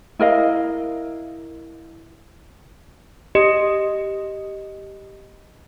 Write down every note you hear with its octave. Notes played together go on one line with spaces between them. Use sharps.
E4 A#4 D#5 F5
G4 D#5